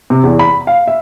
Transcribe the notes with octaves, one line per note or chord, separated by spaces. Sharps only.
C3
E2
B5
F5
E5